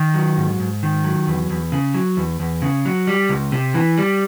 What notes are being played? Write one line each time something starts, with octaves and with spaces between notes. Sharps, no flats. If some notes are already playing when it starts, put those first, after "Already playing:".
Already playing: D#3
F#3
G#2
G#2
D#3
F#3
E2
E2
C#3
F#3
E2
E2
C#3
F#3
G3
C#2
C3
E3
G3